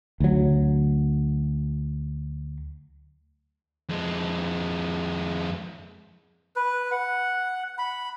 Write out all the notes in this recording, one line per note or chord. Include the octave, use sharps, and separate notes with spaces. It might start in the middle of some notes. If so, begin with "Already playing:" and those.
D2 F#3
F2 G#3
B4
F#5
B5